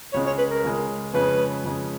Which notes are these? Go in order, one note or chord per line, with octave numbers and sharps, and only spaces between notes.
C#2 C#3 G#3 C#4 C#5
C#5
B4
A#4
C#2 C#3 G#3 C#4
F2 C#3 G#3 C#4 B4
F2 C#3 G#3 C#4